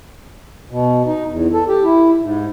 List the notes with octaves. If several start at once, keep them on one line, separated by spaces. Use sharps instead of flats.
B2
D#4
E2
A4
G4
E4
G#2